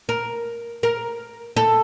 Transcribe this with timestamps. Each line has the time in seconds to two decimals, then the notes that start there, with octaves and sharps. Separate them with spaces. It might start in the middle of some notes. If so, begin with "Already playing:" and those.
0.09 A#4
0.83 A#4
1.57 A4